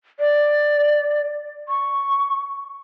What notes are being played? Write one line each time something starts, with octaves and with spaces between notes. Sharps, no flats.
D5
C#6